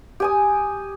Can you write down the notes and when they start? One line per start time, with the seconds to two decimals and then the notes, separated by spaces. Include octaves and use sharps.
0.20 G4 G#5 D#6